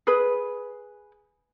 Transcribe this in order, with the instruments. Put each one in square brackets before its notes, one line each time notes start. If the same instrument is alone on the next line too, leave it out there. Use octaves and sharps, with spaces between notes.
[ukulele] G#4 B4